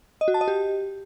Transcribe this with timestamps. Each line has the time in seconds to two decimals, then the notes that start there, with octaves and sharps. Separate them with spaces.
0.21 D#5
0.28 F#4
0.34 A5
0.41 D#5
0.48 G4